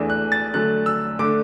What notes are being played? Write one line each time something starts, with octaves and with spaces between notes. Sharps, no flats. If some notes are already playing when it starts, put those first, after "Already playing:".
Already playing: E2 E3 A3 D4
F#6
A6
D3 F#3 A3 F#6
E6
D3 A3 D4 D6